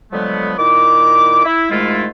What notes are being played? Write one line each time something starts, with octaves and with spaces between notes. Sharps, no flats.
D3 F3 F#3 G#3 A3 B3
A#2 D#3 E4 D6
E4
G#2 D#3 G#3 A3 E4 F4